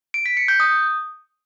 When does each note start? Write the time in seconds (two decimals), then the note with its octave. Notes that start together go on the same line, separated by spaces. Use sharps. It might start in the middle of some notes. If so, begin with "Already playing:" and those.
0.14 D7
0.26 B6
0.37 C#7
0.48 G6
0.60 D#6